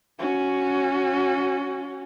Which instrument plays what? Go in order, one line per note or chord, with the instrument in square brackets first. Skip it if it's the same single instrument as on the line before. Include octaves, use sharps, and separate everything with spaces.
[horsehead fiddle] C#4 F#4